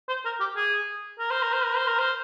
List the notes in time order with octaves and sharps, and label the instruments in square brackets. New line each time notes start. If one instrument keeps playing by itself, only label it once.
[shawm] C5
A#4
G4
G#4
A#4
C5
A#4
C5
A#4
C5
A#4
C5